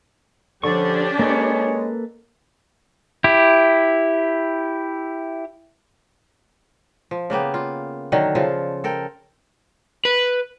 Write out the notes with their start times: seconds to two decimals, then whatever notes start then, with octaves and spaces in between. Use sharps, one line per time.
0.64 D3 F3 C#4 D4 G4 C#6
1.19 G#3 A#3 A4 B4 C#5
3.24 E4 G4
7.11 F3
7.30 C#3 A#3 B3 G4
7.54 F4
8.12 D3 D#3 F#3
8.35 C#3 F3 F4 A4
8.84 A4 A#4 G5
10.05 B4